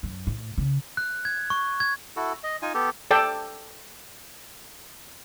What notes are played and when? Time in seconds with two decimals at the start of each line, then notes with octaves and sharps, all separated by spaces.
0.03 F#2
0.27 A2
0.58 C#3
0.97 F#6
1.25 G#6
1.50 C#6
1.80 G#6
2.16 E4 F#4 A4
2.44 D#5
2.62 D#4 F4 G#5
2.74 B3 G4 A4
3.11 A4 D5 G5 A5